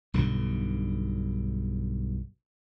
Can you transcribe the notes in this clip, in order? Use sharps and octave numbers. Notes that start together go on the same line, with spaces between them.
B1 G2 B2 D3